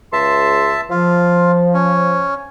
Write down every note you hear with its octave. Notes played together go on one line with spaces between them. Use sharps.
C#2 E5 A5 C6
F3 F4
C#4